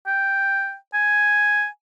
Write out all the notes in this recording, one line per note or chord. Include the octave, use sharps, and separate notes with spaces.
G5
G#5